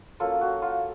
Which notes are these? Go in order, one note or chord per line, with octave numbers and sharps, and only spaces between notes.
F#3 A#3 C#4 F4 A4
F#4
F4